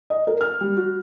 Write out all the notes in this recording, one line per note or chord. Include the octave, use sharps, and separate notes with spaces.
D#5
A#4
F6
G3
F#4